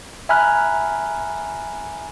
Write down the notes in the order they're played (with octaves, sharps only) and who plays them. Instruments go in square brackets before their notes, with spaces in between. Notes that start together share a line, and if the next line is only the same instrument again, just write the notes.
[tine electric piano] E5 G#5 A#5 B5 F6 F#6